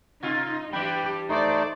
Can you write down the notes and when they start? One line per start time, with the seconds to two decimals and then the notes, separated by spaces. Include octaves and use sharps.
0.23 C3 D#4 F4
0.73 E3 G3 D4 G4 G5 B5
1.29 A3 D#4 C5 D5